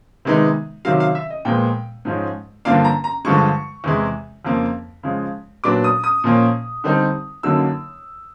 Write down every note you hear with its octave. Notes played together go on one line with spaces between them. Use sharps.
C3 D#3 G#3 B3 D#4
C3 D#3 F#3 F5
F5
E5
D#5
A#2 F3 G#3 B3 G5
G#2 F3 G#3 C#4
G2 D3 F3 A#3 D4 F5
A#5
A#5
G2 D3 F3 G#3 C#6
E2 C3 E3 G#3
F2 C#3 F3 A#3
C#3 F3 G#3
A#2 F#3 B3 D4 D6
D#6
D#6
A#2 F3 A#3 C#4
D3 G3 C4 D#4
F#2 D3 F#3 A#3 D#4 E6